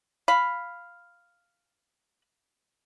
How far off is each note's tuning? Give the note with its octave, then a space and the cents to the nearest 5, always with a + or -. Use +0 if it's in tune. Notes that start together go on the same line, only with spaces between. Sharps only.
F5 +0 B5 +0